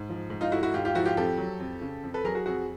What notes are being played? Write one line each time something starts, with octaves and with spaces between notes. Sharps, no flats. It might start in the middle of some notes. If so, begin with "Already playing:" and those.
Already playing: G#2
F3
G#2
D#4 F4
A3 E4 F#4
E4 F#4
G#2 F4 G4
F4 G4
F3 E4 F#4
F4 G4
F2 G4 A4
F#3
F2
C#3
F2
A4 B4
F#3 G#4 A#4
F#4 G#4
F2 F#4 G#4